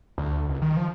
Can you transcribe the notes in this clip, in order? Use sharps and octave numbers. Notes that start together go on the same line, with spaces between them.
D2
C#2
D#3
F3